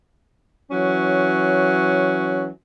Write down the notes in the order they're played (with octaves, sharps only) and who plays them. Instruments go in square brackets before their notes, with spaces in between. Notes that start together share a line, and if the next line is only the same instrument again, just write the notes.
[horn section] E3 F#3 C#4